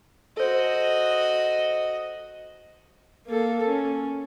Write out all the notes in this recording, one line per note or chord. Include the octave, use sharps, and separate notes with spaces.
F#4 A4 C5 D#5
A#3 A4
C#4